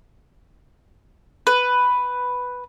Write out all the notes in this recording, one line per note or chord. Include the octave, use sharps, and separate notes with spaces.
B4